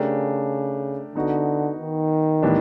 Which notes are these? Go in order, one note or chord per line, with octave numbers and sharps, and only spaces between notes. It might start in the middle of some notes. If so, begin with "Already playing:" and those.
Already playing: C#3 A3 D4 G4 A#4
D3 B3 D#4 F#4
D#3
A2 E3 G3 B3 D4